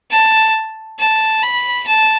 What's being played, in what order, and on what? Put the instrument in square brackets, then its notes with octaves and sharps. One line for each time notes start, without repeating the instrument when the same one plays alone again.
[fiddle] A5
A5
B5
A5